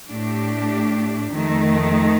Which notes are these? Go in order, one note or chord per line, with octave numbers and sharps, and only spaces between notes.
A2 A3 D4 G4
F2 D#3 A3